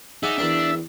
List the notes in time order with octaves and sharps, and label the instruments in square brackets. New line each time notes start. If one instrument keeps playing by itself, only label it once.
[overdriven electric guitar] D#4 [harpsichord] G#4 D5 F#5 [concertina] E5 E6
[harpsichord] E2 A#4 G5 [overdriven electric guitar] D4